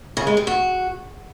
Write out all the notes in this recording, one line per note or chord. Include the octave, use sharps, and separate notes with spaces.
C#3
G#3
G3
F#4